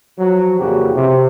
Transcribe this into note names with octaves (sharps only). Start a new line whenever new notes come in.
F3 F#3
F2 A#2 C#3 E3 F#4 G4
C3